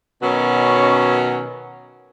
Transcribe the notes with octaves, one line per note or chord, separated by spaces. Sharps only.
B2 D#3 F#3 C#4